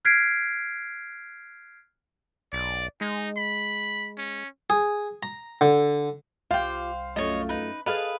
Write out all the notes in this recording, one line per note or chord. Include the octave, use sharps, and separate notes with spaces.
F6 F#6 G#6 B6 C7 D7
B1 D5
G#3 D#4
B5
C#4
G#4
A#5
D3
C2 F4 G4 C5 F5 G5
F#2 A3 F4 C#5 D#5
D#4 B4
G#4 A4 B4 D#5 F5